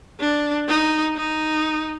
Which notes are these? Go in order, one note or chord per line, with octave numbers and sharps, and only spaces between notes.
D4
D#4
D#4